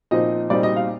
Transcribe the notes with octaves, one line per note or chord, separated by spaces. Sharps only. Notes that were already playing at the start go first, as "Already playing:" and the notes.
A#2 F3 C4 D#4 D#5
A#2 G3 C4 D#4 D5
D#5
F5